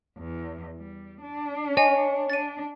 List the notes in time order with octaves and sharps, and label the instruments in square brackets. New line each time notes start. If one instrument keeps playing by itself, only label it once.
[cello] E2
G3
D4
[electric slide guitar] C#5 [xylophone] D#5 G#5
[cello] D4 [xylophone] A6 D#7